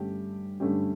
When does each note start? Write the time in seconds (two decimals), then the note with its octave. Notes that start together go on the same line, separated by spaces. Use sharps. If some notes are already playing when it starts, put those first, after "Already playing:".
Already playing: G2 D3 A3 C#4 G4
0.60 G2 D3 A3 C#4 G4